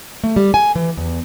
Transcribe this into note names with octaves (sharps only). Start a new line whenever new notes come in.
A3
G3
G#5
E3
E2